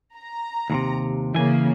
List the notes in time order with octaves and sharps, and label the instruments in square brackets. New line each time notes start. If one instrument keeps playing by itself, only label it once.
[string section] A#5
[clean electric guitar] D#2 A2 C3
[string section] C#3 A#3 [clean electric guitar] E3 G#5